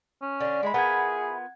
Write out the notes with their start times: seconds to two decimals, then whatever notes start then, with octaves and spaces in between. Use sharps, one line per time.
0.21 C#4
0.40 D3 D4
0.63 G#3 E4 B5
0.74 B3 F4 G#4 A#4 F#5 G#6